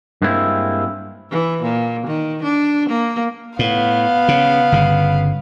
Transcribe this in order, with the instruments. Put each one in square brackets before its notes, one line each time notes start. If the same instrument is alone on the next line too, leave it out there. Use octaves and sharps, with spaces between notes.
[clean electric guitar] G2 G#3 A#3 C4 E4
[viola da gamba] E3
A#2
D#3
D4
A#3
[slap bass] A2 [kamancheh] B3 F5
[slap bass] C#3
G1 C#3